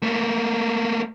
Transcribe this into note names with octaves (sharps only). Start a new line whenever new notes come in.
A3 A#3